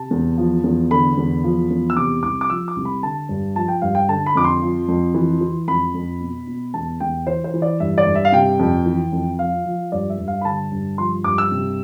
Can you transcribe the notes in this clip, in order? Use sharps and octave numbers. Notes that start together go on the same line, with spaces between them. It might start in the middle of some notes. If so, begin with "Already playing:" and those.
Already playing: C3 A5
E2
F3
E2
D3 B5
E2
F3
E2
E6
C3 D6
C2 D6
D6
F3 E6
D6
C2
B5
D3 A5
G2
F3 A5
G5
G2 F5
G5
D3 A5
B5
F2 D6
C6
F3
F2
E3
E3
F2 B5
F2
B2
B2
E2 A5
E2 G5
E3 C5
C5
E3
D5
G2 E5
D5
G2
E5
F5
C3 G5
F2
E3
F2
F3 F5
F3
G2 D5
E5
G2
F5
B5
D3 A5
G2
F3 C6
G2 D6
E6
C3